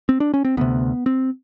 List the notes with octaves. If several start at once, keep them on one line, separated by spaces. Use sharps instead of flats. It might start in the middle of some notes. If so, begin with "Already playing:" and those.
C4
D4
C#4
C4
D2 C3 B3
C4